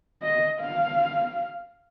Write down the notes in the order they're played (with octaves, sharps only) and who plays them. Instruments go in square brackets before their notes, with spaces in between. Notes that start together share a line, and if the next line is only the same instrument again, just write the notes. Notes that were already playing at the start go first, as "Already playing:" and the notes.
[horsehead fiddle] D#5
F5